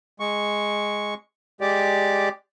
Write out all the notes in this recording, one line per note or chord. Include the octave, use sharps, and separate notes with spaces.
G#3 C#6
G#3 G4 D5